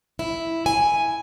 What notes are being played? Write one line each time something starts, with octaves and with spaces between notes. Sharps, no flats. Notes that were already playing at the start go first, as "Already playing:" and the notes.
E4
G#5